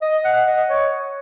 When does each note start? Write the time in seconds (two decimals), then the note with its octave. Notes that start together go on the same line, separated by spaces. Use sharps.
0.02 D#5
0.25 F#5
0.47 D#5
0.70 C#5